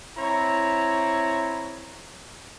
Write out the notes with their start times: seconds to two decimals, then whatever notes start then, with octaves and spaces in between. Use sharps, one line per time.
0.18 C4 E4 C#5 A#5